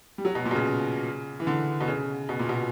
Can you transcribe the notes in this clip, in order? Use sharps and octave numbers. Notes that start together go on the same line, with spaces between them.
G3
F#3
B2
A#2
B2
C#3
E3
D3
B2
C#3
B2
A#2
B2